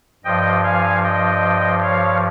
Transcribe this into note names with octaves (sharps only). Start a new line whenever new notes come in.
G2 F3 D#5 G5
F5 G#5
D#5 G5
C#5 F5